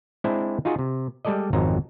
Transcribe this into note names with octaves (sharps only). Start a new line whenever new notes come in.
G#3 C4 D4 E4 C5
D#4 F4 F#4 G#4
C3
G3 G#3 A4 D5 D#5
G#1 F2 F#3 D#4 C5 A#5